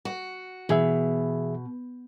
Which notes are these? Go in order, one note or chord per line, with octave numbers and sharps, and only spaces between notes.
F#4
B2 E3 G#4 E5